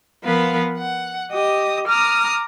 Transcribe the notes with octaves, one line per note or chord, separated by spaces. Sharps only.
F3 B3 A#4 B4 F5
F#5
G4 D#5 D#6
A#5 D6 D#6 F6